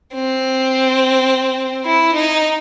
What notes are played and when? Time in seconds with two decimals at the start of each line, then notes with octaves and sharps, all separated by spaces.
0.14 C4
1.85 E4
2.14 D#4